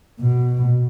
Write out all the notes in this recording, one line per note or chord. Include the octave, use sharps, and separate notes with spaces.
B2